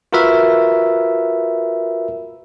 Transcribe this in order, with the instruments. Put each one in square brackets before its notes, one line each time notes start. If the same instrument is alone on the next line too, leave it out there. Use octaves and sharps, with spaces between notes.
[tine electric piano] F4 F#4 A#4 B4 E5